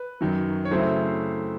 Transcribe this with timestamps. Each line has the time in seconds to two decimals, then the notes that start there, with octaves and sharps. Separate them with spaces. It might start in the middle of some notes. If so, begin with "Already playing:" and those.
Already playing: B4
0.21 F#2 D#3 F#3
0.65 C#5
0.71 C#3 F#3 A3 C4 E4 C5